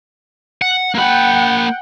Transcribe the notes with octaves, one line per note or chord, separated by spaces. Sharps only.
F#5
A#3 F#5 G5 B5